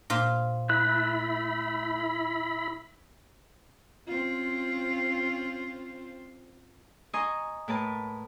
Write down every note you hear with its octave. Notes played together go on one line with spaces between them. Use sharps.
A#2 F4 C5
A3 E4 B5 F#6
C4 C#4 F4
D#5 G#5 A#5 C6 C#6 D#6
A2 A#4 B4 A5